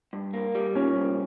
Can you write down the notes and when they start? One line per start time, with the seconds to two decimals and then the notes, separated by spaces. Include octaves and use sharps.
0.13 G2
0.33 A#3
0.55 G3
0.75 A#2 C#4
0.96 C2